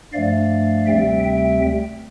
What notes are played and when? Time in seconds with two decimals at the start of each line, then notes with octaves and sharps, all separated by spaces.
0.13 G2 F3 A3 D5 F5
0.87 D2 C3 G3 C4 E5 G5
1.23 E5 G5